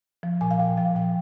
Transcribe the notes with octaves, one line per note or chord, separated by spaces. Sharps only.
F3
A#2 G#5
F5
A#2 G5
F3 F5
A#2 G5